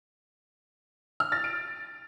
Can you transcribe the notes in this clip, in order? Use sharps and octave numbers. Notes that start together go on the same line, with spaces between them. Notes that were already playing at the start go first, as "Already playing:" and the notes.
F6
A6
D7